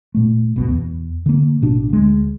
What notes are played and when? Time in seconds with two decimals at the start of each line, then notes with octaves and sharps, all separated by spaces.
0.15 A#2 A3
0.56 G1 C#2 B2
0.71 E2
1.26 D3 A#3
1.61 A1 B2 D4
1.89 D2 G#3